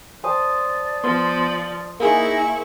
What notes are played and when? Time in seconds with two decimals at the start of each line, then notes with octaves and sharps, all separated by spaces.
0.24 C5 D5 A5 D#6
1.04 F3 B3 C6
2.00 A#3 D#4 E4 G#4 C#6